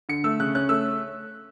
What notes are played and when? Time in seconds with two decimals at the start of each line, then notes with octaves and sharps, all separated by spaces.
0.09 D3 C#7
0.24 A3 E6
0.40 C#3 F#6
0.55 C#4 F#6
0.69 A3 E6